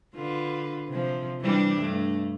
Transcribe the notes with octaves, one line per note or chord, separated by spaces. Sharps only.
D3 F4 B4
C3 F3
E3 G3 D4
G2 A3